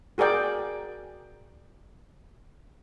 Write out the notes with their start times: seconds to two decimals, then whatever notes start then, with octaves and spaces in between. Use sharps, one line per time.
0.18 F#4 G#4 A#4 D5 G5